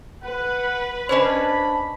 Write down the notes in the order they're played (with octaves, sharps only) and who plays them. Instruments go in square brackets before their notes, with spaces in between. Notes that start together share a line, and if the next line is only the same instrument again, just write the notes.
[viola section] B4 [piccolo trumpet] F#5
[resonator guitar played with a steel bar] C#4 D4 C#5 [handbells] C5 D#5 [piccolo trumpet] B5